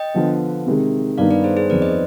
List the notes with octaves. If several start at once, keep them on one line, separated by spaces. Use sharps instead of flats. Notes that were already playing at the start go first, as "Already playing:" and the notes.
Already playing: D#5 G5
D3 F3 B3
C3 D#3 G#3
G2 D#3 B3 D#4 D5 F5
B4 D5
G#4 C5
G#4 C5
F2 D#3 B3 B4 D5
C5 D#5